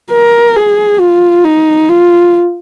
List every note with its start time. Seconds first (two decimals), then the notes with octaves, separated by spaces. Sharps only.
0.12 A#4
0.56 G#4
1.00 F4
1.44 D#4
1.89 F4